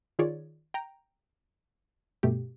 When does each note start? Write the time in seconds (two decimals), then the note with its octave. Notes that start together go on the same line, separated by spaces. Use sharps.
0.19 D#3 F4 G#4 C#5 D5
0.74 G5 A#5
2.23 G2 B2 A3 G4